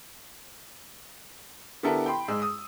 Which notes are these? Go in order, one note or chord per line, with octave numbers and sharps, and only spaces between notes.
D3 B3 E4 G4 A4 A#4
G5 B5 C6
G#2 G#3 G#4 E6
D#6